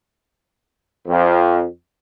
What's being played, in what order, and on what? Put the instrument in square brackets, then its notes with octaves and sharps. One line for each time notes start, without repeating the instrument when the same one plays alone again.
[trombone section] F2